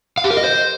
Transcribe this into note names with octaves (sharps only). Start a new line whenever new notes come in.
F5
G4
A#4
D#5
C5